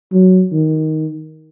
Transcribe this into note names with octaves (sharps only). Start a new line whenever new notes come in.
F#3
D#3